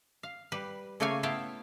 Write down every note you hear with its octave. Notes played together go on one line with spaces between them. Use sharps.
F5
G3 B4
C#3 A3 A#3 C#5 F5 G#5
B3 E4 F5 G5 A5